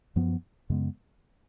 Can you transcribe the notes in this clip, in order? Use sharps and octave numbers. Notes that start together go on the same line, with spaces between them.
F#2 F3 B3
F#2 C#3 G#3 B3